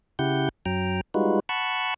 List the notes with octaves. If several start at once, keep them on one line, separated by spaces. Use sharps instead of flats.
C#3 E4 G4 F#5 G6
F#2 F#3 G5 A#5
G3 G#3 D#4 F4 F#4 B4
F#5 A5 B5 C#6